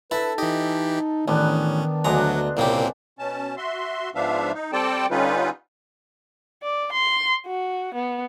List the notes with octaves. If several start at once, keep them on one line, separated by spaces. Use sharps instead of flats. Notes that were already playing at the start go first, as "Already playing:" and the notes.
E4 A4 B4 E5 A5
E3 D#4 G4 D#5
A1 D#3 B3 C#4 D4
D2 F#3 G#3 D4 A#5
C2 A#2 C#3 A#3 C4 G4
B2 C#4 A5
F#4 E5 C6
G#2 F3 B3 D4 E5 F5
D#4
G3 C4 A4 D5 G5 A5
D3 G3 C#4 D#4 F4 B4
D5
C6
F#4
B3